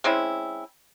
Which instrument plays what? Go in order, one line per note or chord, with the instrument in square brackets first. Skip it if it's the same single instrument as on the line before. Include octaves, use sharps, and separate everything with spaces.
[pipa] G#3 C4 C#4 E4